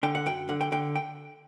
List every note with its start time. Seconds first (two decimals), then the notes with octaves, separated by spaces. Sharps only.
0.03 D3 G5
0.15 F#5
0.26 F#2 G5
0.49 D3 F#5
0.61 G5
0.72 D3 G5
0.95 G5